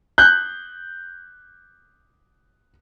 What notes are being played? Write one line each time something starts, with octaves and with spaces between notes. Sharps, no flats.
F#6 G6